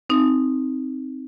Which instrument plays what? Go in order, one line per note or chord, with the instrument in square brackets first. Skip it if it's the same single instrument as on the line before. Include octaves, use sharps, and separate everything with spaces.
[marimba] C4 D#4